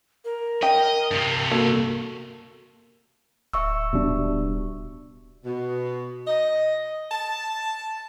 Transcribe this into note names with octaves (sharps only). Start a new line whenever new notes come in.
A#4
D#5 G5
G2 C3
A#3 F#4 A4
D1 E5 C#6 E6
B2 G3 D4
B2
D#5
A5